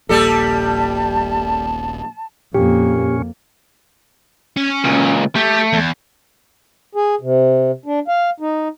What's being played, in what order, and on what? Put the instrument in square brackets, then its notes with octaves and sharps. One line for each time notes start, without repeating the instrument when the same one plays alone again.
[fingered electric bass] D#1 A#1 A#3 [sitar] G3 G4 A4 [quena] A5
[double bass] F2 A#3 [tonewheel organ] A#2 C#4 [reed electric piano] G4
[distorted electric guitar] C#4 G#5
[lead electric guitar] C#2 A#2
[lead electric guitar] A3 [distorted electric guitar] G4
[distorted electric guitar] E2
[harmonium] G#4
C3
D4
F5
D#4